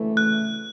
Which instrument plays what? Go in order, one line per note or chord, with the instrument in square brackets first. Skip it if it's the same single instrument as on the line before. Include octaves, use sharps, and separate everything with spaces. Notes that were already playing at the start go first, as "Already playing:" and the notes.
Already playing: [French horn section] D2 C#3 E3 A3 E4
[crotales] F#6